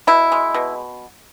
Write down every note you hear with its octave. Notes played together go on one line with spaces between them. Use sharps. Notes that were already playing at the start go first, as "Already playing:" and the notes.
B2 E4
G#3
B2